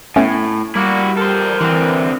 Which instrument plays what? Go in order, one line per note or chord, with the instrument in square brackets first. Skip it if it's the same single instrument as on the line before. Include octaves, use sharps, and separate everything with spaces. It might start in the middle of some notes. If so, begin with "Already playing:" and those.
[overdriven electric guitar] A2 [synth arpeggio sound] A3 B3 C#4
[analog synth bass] G3 [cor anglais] A#3 [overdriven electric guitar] E4 F#4
[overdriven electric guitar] A4 C5 [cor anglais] A#4
[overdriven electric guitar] D3 C4 [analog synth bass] E3